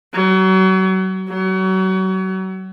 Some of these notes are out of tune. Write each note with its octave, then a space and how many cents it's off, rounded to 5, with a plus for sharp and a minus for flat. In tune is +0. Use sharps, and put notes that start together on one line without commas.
F#3 +30
F#3 +30